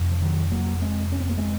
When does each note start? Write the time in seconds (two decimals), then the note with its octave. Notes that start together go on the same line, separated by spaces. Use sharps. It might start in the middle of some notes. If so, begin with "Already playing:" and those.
Already playing: F2 C3
0.12 F3
0.22 D#3 F#3
0.52 F#3 A#3
0.82 G#3 C4
1.12 C#4
1.20 C4
1.29 A#3
1.38 G#3 C4